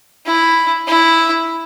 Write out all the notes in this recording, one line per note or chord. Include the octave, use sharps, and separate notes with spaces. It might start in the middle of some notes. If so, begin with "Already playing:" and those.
E4
E4